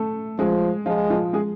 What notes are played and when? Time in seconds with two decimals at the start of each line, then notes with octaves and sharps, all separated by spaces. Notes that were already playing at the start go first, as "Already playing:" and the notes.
Already playing: A3 A4
0.39 F3 G#3 G#4
0.86 F3 G#3 F4
1.10 F3 F4
1.33 G#3 G#4